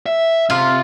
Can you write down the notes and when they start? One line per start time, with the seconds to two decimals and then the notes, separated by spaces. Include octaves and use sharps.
0.06 E5
0.50 C3 F4